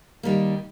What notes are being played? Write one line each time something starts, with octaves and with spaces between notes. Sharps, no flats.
D#3 G3 A#3